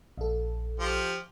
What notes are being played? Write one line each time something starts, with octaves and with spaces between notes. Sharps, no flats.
A#1 A4
F3 G4